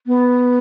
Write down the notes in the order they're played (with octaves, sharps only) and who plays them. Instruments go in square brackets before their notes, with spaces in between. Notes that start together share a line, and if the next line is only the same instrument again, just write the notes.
[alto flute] B3